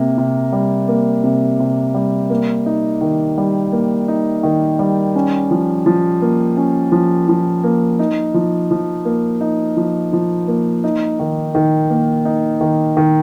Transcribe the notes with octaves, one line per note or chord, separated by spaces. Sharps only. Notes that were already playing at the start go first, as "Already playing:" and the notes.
Already playing: C3 A#3
C3
G3
A#3
C3
C3
G3
A#3
D#4
D#3
G3
A#3
D#4
D#3
G3
C#4
F3
F3
A#3
C#4
F3
F3
A#3
D#4
F3
F3
A#3
D#4
F3
F3
A#3
D#4
D#3
D#3
A#3
D#4
D#3
D#3